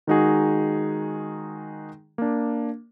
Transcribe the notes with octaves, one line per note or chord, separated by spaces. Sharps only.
D#3 G#3 D#4 F#4 G#4
A#3 D4